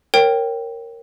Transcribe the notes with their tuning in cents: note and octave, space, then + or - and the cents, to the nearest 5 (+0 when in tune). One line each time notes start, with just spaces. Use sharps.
A#4 -5 C#5 -30 G5 +0